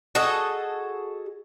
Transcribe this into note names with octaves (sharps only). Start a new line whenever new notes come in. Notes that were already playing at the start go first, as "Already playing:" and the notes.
F#4 G#4 A4 D#5